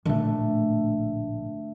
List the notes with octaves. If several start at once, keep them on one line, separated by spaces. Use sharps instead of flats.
A#1 A2 D3 A3